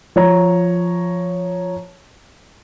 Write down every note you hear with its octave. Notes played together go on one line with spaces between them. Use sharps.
F3 C#5 A#5